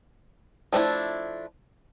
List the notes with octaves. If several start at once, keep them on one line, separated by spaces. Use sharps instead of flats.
F3 A3 C4 D4 E4